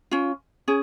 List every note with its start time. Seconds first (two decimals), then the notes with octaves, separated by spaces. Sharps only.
0.11 C#4 F4
0.68 C#4 G#4